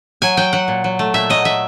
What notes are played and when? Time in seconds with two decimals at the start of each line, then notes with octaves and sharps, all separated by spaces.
0.22 F#3 G#5
0.37 F#3 G5
0.53 F#3 F#5
0.68 A#2
0.84 F#3
0.99 A3
1.14 A#2 E5
1.30 F#3 D#5
1.45 F#3 E5